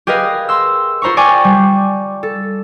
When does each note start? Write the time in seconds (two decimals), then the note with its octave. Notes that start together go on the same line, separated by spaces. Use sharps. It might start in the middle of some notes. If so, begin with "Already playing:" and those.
0.07 G4 G#4 A#4 B4 D#5 F5
0.49 C6 E6
1.02 F4 C5 A#5 B5 C#6
1.17 D5 G5 G#5 C#6 D6
1.44 G3
2.23 A4